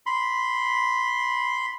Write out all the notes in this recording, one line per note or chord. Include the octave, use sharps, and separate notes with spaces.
B5 C6